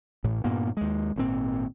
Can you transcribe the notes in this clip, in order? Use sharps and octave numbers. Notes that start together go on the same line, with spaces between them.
A1 A2
G2 A#2 A#3 B3
D#2 G#3
G#1 A#2 C4